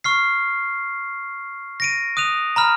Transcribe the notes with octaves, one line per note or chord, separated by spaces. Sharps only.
C#6 F6 C7
A#6 D7 D#7
D#6 F#6 D#7 F7
A#5 B5 F6